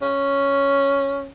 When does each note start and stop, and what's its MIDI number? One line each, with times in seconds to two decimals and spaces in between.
0.02 1.31 61